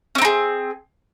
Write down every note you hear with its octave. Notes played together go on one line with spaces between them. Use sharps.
C4 C#4 D#4 G#4